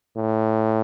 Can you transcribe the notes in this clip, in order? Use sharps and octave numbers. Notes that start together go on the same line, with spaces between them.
A2